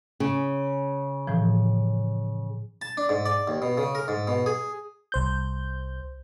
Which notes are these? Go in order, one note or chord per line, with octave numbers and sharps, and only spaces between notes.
C#3
A2 E3 F3
A5
D4
G#2
D5
D#2
B2
C#3
A#4
G#2
B2
G#4
C2 C5 G6